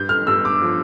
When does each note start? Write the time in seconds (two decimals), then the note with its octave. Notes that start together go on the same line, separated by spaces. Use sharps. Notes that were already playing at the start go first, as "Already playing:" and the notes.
Already playing: G2 G6
0.09 F6
0.27 G2 E6
0.45 D6
0.62 F3